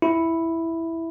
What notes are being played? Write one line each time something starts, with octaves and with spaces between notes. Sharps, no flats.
E4